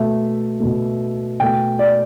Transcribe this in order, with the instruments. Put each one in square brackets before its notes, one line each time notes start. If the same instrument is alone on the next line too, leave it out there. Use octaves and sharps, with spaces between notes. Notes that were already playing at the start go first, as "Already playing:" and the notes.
Already playing: [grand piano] B2 A3 E5
B2 A3
B2 A3 G5
D5